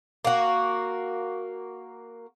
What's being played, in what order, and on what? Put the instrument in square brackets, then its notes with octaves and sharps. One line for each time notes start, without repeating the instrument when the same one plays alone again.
[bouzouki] A#3 F#4